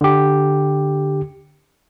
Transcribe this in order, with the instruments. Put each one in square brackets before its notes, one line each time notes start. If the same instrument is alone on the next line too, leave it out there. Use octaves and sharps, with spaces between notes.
[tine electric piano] D3 G4